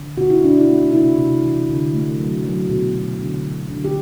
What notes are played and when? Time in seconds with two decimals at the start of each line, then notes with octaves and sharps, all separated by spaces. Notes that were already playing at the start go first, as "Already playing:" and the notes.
Already playing: D3
0.17 B2 F#4
0.30 E4
0.42 B2 D4
0.57 E4
0.68 A3
0.92 C3 E4
1.19 C3
1.43 E3
1.69 D3
1.93 A3
2.19 F#3
2.44 F#3
2.69 B2
2.95 B2
3.19 D3
3.45 D3
3.70 D3
3.85 G4